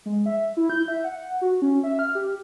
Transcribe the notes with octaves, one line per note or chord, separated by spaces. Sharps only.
G#3
E5
E4
G6
E5
F#5
F#4
C#4
E5
F6
G4